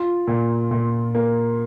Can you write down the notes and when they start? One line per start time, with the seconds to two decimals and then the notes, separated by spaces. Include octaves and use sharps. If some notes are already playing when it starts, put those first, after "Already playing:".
Already playing: F4
0.28 A#2
0.71 A#2
1.15 A#3